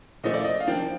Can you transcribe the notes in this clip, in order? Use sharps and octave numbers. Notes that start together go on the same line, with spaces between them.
A#2 F3 A3 D#5
D5
D#5
F5
F3 A#3 D4 G5